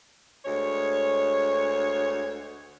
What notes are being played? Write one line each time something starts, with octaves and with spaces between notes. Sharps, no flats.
D2 G#3 C#5